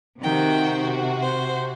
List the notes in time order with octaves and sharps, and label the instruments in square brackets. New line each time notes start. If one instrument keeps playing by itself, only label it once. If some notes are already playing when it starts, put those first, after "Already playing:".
[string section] C3 F#4 [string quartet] D#3 G5
[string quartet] C5